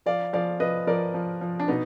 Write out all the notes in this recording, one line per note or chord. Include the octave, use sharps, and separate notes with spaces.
F3 D5 F5
F3 D5 F5
F3 B4 D#5
F3 A#4 D5
F3
F3
D4
B2 B3 D#4